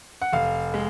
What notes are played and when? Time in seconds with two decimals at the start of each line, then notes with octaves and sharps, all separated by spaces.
0.22 F#5
0.33 F1 F5
0.74 G#3